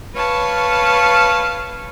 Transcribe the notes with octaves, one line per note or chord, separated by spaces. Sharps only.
B4 C#5 F5 A5 C#6